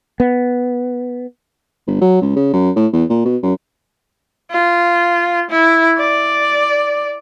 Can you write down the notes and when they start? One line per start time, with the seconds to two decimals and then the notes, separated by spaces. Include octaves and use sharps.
0.20 B3
1.87 G1
2.01 F#3
2.21 C#2
2.36 C#3
2.53 F#2
2.76 A2
2.93 E2
3.09 A#2
3.25 B2
3.42 F#2
4.51 F4
5.51 E4
5.98 D5